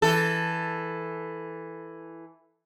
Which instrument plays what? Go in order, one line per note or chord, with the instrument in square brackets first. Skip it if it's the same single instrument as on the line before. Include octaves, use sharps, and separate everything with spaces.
[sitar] E3 A4